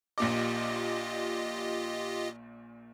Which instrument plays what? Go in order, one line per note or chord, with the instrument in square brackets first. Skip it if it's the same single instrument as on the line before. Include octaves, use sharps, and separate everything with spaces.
[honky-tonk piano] A#1 A#2 D6 [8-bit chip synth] F4 G4 D#5